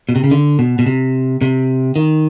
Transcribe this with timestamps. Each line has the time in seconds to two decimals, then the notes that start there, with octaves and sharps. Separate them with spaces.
0.09 B2
0.16 C3
0.24 C#3
0.31 D3
0.59 B2
0.79 B2
0.86 C3
1.42 C3
1.96 D#3